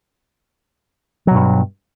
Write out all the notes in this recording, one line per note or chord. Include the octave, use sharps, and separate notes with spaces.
G2 B2 F#3